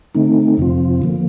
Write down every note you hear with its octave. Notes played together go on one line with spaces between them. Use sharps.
D3 A3 C4 D#4
F2 C3 F3 C4 F4
D3 F3 A#3